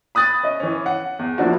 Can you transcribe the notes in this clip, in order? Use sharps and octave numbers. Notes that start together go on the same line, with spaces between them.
B5 D#6 F#6 A6
C#4 D#5
E3 C#4
F#5
E2
F3 A#3 D4 E4 F#4